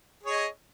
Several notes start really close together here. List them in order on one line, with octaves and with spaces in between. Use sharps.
G#4 C#5 D#5